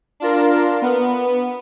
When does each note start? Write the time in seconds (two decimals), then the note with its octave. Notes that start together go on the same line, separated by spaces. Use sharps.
0.20 D4 F4 A#4
0.82 B3